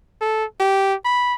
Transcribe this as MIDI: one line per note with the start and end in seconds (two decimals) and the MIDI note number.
0.21 0.44 69
0.60 0.94 67
1.05 1.35 83